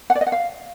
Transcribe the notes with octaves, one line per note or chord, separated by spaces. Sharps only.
F#5
D5
D#5
F#5
F5